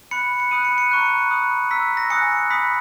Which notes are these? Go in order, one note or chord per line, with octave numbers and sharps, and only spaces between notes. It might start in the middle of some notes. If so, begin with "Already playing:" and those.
B5 F#6 C#7
C#7
B5 D#6 F#6 D#7
C#7
C#7
A#5 C#6 F#6
B5 D#6 F#6
A#5 E6 B6
A#6
G#5 D#6 F#6 C#7
B5 D#6 F#6 B6